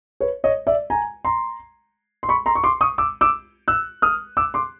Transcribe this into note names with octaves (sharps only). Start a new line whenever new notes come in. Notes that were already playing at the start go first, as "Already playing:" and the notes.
B4 C#5
C#5 D#5
D5 E5
G#5 A#5
A#5 C6
C6
B5 C#6
A#5 C6
C#6
C6 D6
C#6 D#6
D6 E6
D6 E6
E6 F#6
D#6 F6
D6 E6
C6 D6